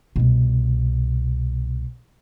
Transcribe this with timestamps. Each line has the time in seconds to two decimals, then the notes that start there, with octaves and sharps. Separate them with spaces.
0.16 C2 B2